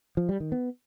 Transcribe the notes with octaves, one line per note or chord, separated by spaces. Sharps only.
F3
G3
D#3
B3